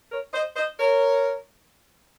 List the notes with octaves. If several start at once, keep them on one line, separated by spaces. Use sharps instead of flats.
A#4 C#5
C5 D#5
C5 D#5
A#4 C#5